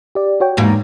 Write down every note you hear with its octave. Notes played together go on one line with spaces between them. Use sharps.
G4 D5
F#4 C#5 G5
E2 G#2 A#3